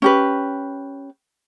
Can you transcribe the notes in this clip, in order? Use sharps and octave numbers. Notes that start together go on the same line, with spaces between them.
C#4 G4 B4